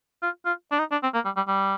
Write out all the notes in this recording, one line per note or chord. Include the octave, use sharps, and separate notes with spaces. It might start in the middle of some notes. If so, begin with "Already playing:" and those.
F4
F4
D4
D#4
D4
C4
A#3
G3
G3
G3